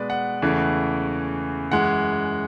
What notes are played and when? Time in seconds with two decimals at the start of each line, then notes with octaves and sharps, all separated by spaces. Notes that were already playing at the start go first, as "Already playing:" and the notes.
Already playing: B2 G#3 B3 B4 D5
0.10 F#5
0.42 E2 C#3 E3 A3
1.71 F#2 E3 G#3 F#5